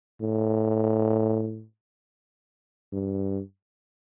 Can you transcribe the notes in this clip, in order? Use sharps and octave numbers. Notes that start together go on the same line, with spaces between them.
A2
G2